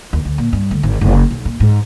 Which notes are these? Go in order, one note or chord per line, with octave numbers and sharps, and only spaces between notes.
D#2
D2
A#2
G2
D2
G#1
F#1
B1
A#2
G#2